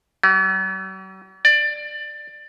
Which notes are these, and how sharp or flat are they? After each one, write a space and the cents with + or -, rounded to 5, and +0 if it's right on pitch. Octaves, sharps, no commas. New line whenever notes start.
F#3 +45
D5 +15